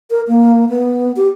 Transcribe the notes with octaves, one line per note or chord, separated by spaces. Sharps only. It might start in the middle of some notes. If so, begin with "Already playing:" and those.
A#4
A#3
B3
G4